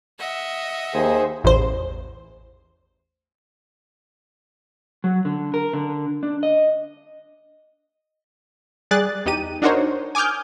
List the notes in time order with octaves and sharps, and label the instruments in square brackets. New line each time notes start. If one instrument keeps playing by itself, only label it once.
[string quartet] D#5 E5 F#5
[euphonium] D#2 [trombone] G#4 [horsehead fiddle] C5
[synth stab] A1 E2 C5
[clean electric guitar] F#3
D3
A#4
D3
D4
D#5
[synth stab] G3 G#4 D5 F#6 A6
E2 D#4 G4 D#7
D4 D#4 F#4 A#4 C5 C#5
G#5 D6 D#6 F6 G6